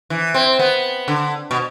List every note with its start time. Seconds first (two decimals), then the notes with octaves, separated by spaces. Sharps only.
0.10 E3
0.34 C4
0.59 B3
1.08 D3
1.51 B2